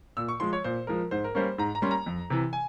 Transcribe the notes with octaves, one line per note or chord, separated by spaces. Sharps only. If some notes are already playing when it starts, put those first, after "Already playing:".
A#2 E6
C#6
F3 G#3 C6
C#5
A#2 C5
F3 G#3 A#4
G#2 C5
A#4
G3 A#3 C#4 C5
G#2 A#5
A#5
G3 A#3 C#4 C6
A#5
F2
C3 E3
G#5